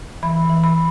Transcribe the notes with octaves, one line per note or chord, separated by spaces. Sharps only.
E3 B5
E3
B5